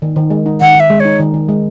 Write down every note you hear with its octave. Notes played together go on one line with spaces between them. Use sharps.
D#3
D#3
G#3
D#4
D#3 F#5
D#3
E5
G#3
C#5
D#4
D#3
D#3
G#3